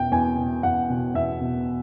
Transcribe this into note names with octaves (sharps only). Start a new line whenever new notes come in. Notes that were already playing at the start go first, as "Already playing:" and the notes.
Already playing: E2 B2 G5
E2 G#5
B2
E2 F#5
B2
E2 E5
B2